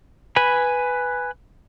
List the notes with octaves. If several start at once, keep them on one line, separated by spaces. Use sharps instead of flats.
B4 G#5 B5